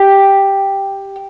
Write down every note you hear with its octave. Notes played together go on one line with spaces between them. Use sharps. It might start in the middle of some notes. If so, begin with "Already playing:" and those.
Already playing: G4